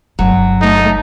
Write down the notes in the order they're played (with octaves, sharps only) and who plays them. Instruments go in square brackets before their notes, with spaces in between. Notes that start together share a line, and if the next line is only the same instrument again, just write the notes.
[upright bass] G1 C3 [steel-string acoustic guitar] F#3
[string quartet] A3 [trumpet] D#4